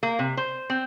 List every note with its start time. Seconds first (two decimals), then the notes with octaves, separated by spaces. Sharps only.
0.03 A#3
0.19 C3
0.37 C5
0.70 C4